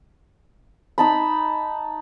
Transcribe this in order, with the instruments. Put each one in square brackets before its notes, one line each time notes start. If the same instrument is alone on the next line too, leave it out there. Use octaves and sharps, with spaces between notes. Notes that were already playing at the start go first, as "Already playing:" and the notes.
[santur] D#4 A5 B5